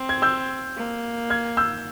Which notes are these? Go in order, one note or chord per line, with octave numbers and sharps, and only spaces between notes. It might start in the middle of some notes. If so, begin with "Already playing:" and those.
Already playing: C4
G#6
E6 G6
A#3
F6 G#6
E6 G6